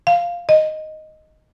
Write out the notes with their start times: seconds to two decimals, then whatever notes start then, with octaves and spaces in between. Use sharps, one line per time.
0.07 F5
0.49 D#5